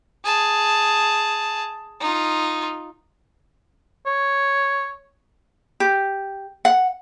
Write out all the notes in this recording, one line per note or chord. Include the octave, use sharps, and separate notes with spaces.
G#4 A5
D#4 F4
C#5
G4
F#5